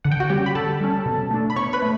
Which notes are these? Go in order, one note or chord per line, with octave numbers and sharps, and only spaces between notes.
D3 F#5
G5
F#4 F#5
G3 C#4 G4 G5
B5
D3 A4 A5
G3 C#4
B2
A3 D4
B5
B2 C#5 C#6
B4 B5
A3